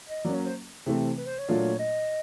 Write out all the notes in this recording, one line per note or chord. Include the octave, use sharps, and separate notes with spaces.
D#5
F#3 A#3 C#4 D5
C#5
C5
C3 E3 A3 C4
B4
C5
C#5
A#2 F#3 A3 D4 F4
D#5